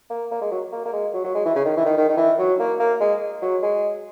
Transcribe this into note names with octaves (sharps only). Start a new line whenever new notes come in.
A#3
A#3
G#3
F#3
A#3
A#3
G#3
F#3
F#3
G#3
E3
C#3
D#3
E3
D#3
D#3
D#3
E3
F#3
A#3
A#3
G#3
F#3
G#3